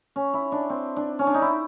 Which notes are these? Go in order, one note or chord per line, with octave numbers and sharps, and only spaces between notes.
C#4
E4
D4
C4
D4
C#4
D4
D#4
E4